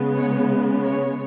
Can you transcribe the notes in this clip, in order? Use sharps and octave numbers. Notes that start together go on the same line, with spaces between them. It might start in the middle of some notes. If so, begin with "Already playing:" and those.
Already playing: C#3 G#3 B3
C#5
C#5